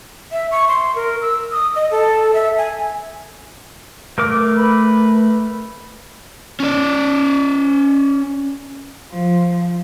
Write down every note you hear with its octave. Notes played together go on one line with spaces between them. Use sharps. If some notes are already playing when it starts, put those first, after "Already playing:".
E5
C#6
C6
A#4
E6
D#6
D#5
A4
E5
G#5
A3 A#4 D6
B4
C#4 D5
F3